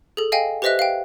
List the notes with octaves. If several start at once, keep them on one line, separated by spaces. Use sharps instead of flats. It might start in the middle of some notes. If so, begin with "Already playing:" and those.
G#4 A4
D#5 F5 G5 G#5
G4 B4 C5 D#5 E5 F#6
F5 G5